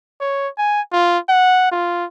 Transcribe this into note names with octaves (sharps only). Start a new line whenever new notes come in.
C#5
G#5
F4
F#5
F4